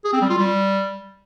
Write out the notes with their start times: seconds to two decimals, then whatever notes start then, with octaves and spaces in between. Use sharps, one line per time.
0.05 G#4
0.13 C4
0.21 G3
0.30 F4
0.38 G3